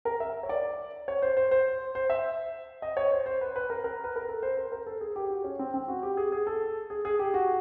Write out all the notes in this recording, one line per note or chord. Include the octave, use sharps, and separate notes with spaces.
A#4
E5
C#5
D5
C#5
C5
C5
C5
C5
E5
D#5
C#5
C5
C5
B4
B4
A#4
A#4
B4
A#4
A4
C5
A#4
A#4
A4
G#4
G4
F#4
C#4
C4
C4
F#4
G4
G#4
G#4
A4
G#4
G#4
G4
F#4